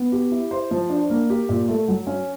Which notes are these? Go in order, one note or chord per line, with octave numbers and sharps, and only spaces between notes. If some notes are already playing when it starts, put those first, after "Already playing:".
Already playing: B3
G4
E4
C5
F3
D4
A#3
G4
A#2
A3
F#3
C#4